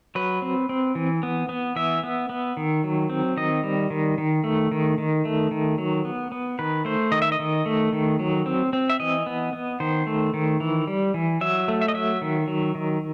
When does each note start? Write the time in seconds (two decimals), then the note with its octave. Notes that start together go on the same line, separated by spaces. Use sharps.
0.15 F#3 B4
0.42 C4
0.69 C4
0.95 E3
1.23 B3
1.49 B3
1.76 E3 E5
2.03 B3
2.29 B3
2.57 D#3
2.84 F#3
3.10 C4
3.37 D#3 D#5
3.63 G3
3.90 D#3
4.18 D#3
4.44 A3
4.72 D#3
4.98 D#3
5.25 A3
5.51 D#3
5.78 F#3
6.05 B3
6.32 B3
6.59 D#3 B4
6.85 A3 C5
7.12 D#3 D#5
7.22 E5
7.32 D#5
7.39 D#3
7.66 A3
7.93 D#3
8.19 F#3
8.46 C4
8.73 C4
8.90 E5
9.00 E3 D#5
9.26 B3
9.53 B3
9.80 D#3 C5
10.07 A3
10.34 D#3
10.60 E3
10.87 G3
11.14 E3
11.41 F#3 E5
11.68 A3
11.81 E5
11.88 D#5
11.94 F#3 E5
12.22 D#3
12.48 F#3
12.75 D#3